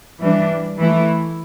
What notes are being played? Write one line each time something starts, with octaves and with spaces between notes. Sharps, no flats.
E3 G3 D4
E3 A3 E4